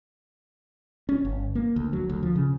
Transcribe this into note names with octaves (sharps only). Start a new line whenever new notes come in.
C#4
G1
A#3
D2
F#3
D2
F3
C#3